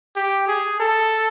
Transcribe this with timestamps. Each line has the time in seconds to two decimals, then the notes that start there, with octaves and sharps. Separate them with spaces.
0.16 G4
0.48 G#4
0.80 A4